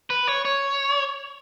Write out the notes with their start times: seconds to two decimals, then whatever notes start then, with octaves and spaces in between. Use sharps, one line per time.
0.10 B4
0.27 C#5
0.45 C#5